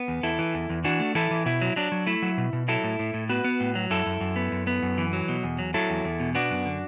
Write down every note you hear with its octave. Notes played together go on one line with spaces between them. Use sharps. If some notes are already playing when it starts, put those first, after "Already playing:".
Already playing: B3
E2
E2 E4 A4
E3
E2
E2
E3 D4 F#4
A3
E3 E4 A4
E3
B2 E4
F#3
F#3 D4
F#3
A3 E4
F#3
B2
B2
F#3 E4 A4
A2
A2
A2
B3 F#4 B4
B3
A2
F#3
F#2 E4 A4
F#2
F#2
B3
F#2
B3
F#2
E3
F#3
B2
E2
F#3
F#3 E4 A4
E2
E2
B2
B3 D4 F#4
F#2
D3